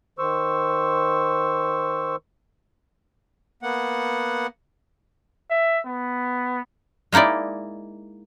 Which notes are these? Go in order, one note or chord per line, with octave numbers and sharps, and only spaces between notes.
D#3 C5 C#6 E6
A#3 B3 F#5
E5
B3
G#3 A#3 D#4 E4 D5